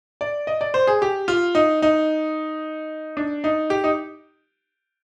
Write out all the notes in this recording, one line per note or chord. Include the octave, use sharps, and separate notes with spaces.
D5
D#5
D5
C5
G#4
G4
F4
D#4
D#4
D4
D#4
G4
D#4